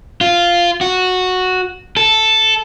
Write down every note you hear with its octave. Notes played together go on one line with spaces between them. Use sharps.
F4
F#4
A4